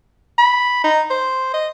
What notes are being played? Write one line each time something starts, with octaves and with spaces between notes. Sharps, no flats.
B5
D#4
C5
D#5